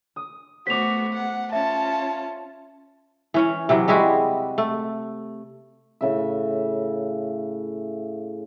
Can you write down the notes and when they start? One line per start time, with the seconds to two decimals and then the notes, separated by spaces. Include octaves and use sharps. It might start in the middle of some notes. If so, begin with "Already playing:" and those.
0.16 D#6
0.67 A3 B3 F#4 C5 D6 B6 F7
1.13 F#5
1.53 C#4 F4 E5 A5
3.34 E3 C#4 C#5
3.69 C3 E3 F#3
3.88 G3 G#3 E4 F#4
4.58 A3
6.01 A2 C#3 E5